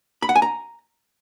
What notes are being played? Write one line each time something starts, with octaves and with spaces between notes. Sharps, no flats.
B5
F#5
G#5
A#5